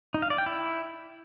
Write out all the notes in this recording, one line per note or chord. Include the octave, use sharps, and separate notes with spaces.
D#4
F5
D5
G5
E4